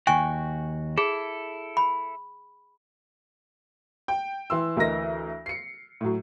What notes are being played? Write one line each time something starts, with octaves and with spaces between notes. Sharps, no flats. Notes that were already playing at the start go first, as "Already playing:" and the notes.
D#2 F#4 G5 G#5 C#6
E4 G#4 A4
B5
G5
E3 C6 E6
D2 E3 A#4 D#5 A#6
C7 C#7
A2 F#3